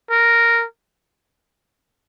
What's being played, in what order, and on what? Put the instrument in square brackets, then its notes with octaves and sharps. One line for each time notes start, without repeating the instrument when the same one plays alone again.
[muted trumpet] A#4